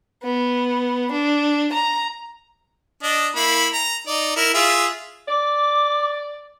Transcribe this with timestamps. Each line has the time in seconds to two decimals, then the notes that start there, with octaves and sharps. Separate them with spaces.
0.23 B3
1.11 D4
1.73 A#5
3.03 D4 D#5
3.36 A#3 E4 B5
3.73 A#5
4.07 D#4 D5
4.36 E4 A#4
4.54 F4 G#4 E5
5.28 D5 D6